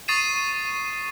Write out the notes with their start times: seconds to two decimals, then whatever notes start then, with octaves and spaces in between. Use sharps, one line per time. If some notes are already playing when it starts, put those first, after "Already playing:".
0.08 C#6 D#6 A6 C7 D#7 E7